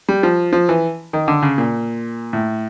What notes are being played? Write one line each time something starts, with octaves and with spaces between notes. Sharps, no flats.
G3
F3
F3
E3
D#3
D3
C#3
A#2
A2